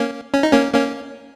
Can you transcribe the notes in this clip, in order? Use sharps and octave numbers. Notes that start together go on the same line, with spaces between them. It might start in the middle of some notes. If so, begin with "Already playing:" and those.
Already playing: A#3 C#4
C#4
D#4
A#3 C#4
A#3 C#4